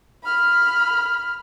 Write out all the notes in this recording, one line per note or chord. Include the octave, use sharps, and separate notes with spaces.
B5 F6